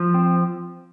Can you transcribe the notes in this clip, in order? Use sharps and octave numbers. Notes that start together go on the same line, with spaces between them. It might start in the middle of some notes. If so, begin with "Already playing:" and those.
Already playing: F3
C4